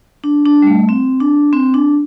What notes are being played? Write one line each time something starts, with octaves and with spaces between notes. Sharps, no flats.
D4
D4
G3
A3
C4
D4
C4
D4